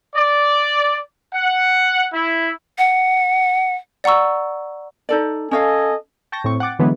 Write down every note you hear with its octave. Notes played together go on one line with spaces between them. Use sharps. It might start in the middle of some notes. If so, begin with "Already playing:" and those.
D5
F#5
E4
F#5
D5 F#5 A#5 C#6 E6
D#4 A4 D5
C#4 A4 C#5 D#5 F5 G#5
G5 A5 C#6 G6 A#6
A2 C4 C#6
F#5 G5 D6 A6
D3 E3 F#3 G#3 B3